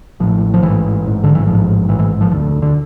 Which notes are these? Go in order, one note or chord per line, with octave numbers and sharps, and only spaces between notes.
A1 A2 F3
F3
A1 G#2 E3
A1 G#2
D3
E3
A1 G#2 F3
A1 G#2 E3
E3
F3
E1 D2 D3 F3
D3